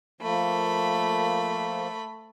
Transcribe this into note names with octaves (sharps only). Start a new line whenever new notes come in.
F3 A3 A#3 B5